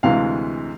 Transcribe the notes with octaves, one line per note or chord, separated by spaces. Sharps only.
D2 C3 E3 G#3 F5